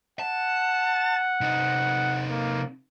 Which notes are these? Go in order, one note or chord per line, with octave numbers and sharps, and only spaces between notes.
F#5 A5
C3 D#4
A#3